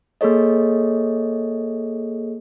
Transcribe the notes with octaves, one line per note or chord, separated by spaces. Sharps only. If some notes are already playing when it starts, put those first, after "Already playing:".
A#3 G#4 A4 C#5 D#5